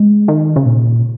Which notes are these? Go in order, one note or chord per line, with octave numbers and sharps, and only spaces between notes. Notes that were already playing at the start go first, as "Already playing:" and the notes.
Already playing: G#3
D#3
C#3
A#2